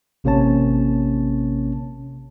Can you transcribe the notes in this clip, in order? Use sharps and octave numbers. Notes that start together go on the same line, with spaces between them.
A1 C3 A#3 C#4 C#5 A5